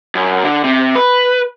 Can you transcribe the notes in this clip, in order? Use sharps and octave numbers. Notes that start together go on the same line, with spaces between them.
F#2
D3
C3
B4